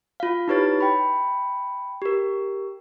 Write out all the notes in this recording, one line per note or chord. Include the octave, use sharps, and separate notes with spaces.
F4 F5
D#4 E4 G4 B4 C#5 A6
G5 B5
G4 A#4